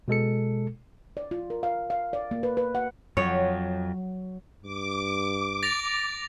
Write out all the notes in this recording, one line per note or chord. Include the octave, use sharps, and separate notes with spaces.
B2 G#3 A4 C#7
D5
F4
A#4
F5
F5
D5
A#3
B4
B4
F#5
F2 F#3 C#5
G2 D6
A6 A#6 F7